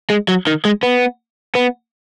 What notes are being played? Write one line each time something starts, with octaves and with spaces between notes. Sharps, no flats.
G#3
F#3
D#3
G#3
B3
B3